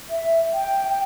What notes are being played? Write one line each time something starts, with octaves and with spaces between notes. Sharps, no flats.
E5
G5
G5